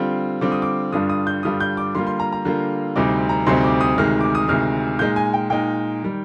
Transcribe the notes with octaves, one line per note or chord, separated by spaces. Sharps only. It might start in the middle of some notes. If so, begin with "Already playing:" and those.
Already playing: D3 G3 C4 F4
D3 G3 C4 F4 D6
D#6
D6
G2 D3 G3 D4 F4 D#6
D#6
G6
G2 D3 G3 D4 F4 D#6
G6
D6
D3 G3 A#3 F4 C6
C6
A#5
A#5
D3 G3 A#3 F4
D2 C3 G3 C4 D#4 D6
A#5
D2 C3 G3 C4 D#4 C6
D6
D#6
D2 C3 D#3 G#3 F6
D6
D#6
D2 C3 D#3 G#3 F6
A#2 G#3 D#4 G6
G#5
G5
A#2 G#3 D#4 G5
D#3 G3